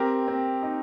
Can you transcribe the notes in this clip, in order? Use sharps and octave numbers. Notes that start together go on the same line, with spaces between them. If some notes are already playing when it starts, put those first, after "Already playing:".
Already playing: C4 G4 A#4
C4
D#4